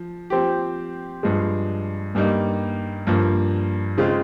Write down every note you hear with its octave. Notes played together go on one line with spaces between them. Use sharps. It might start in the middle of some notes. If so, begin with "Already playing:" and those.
Already playing: F3
F3 C4 G4
G2 F3 G#3
G2 G3 A#3 D#4
G2 F3 A#3
C#3 G#3 C4 F4